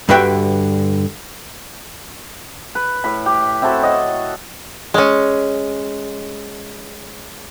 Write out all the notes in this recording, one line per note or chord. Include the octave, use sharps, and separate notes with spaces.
G2 D3 F#4 B4 E5 G5
B4
A2 B5
G4
C4 E4 F#4 A4
C#5 D#5 F#5
G#3 C#4